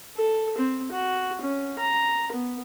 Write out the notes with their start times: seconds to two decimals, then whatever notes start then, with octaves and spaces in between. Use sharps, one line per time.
0.17 A4
0.58 C4
0.92 F#4
1.41 C#4
1.79 A#5
2.32 B3